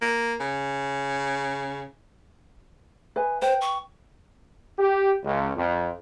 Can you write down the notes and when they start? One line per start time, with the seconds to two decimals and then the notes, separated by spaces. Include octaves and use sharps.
0.02 A#3
0.40 C#3
3.16 B4 D#5 G#5
3.42 B4 C5 G5
3.61 C#6
4.78 G4
5.24 C#2
5.56 F2